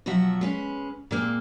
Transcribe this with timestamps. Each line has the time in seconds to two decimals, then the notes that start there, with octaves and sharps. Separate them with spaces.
0.06 B2 F3 F#3 F#4 E5
0.41 G#3 C#4 B4
1.11 A#2 G#3 A#3 C4